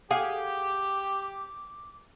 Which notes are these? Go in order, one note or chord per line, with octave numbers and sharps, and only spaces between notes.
G4 G#4 F5 F#5 D6